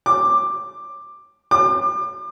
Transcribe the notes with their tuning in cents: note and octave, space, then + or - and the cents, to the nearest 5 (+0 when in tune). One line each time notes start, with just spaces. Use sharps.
D6 +10
D6 +35